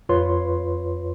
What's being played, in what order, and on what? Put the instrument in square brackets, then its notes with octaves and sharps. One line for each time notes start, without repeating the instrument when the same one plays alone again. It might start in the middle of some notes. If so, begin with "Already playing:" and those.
[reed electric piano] F2 F4 B4 C#5 C6